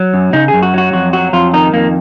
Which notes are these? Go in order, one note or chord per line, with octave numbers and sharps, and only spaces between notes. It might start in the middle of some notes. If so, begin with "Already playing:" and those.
Already playing: F#3
F#2
C#3 D#4
G#4
F#2
F#4
F#3 F#4
F2 F#4
F#3 F#4
F2 F4
D#3 D#4
F2 A#3